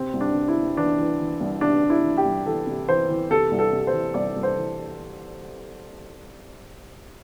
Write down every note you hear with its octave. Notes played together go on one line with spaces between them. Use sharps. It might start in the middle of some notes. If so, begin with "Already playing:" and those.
Already playing: C3 C4
C2
D4
C3
E4
C3
E3 D4
E3
E3
C2
C3 D4
C3
E4
E3
G4
C2
E3 A4
C3
E3 C5
E3
C3 A4
C2
A4
C3
C5
E3
C2 D5
C2
C5
E3